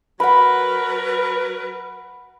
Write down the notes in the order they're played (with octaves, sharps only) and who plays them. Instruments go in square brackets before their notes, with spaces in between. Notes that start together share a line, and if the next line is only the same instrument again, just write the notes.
[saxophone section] F#3 A#4 B4 [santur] F#5 B5